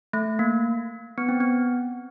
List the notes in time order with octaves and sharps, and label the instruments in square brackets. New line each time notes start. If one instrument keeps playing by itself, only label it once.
[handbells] A3
A#3
B3
C4
B3